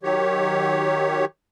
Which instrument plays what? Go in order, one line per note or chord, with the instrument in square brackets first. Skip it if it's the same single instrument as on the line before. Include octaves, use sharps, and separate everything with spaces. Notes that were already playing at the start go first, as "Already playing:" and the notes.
[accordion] D#3 F#3 G4 C#5